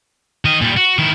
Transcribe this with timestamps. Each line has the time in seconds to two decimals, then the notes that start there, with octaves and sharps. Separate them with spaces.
0.45 D#3 D#5
0.61 A#2 G3
0.77 F#4
0.98 D#3 E4